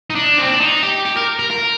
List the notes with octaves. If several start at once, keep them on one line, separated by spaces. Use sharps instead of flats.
D#4
D4
C4
D4
D#4
G4
G4
A#4
A#4
A#4